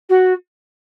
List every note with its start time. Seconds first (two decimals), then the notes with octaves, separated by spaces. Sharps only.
0.09 F#4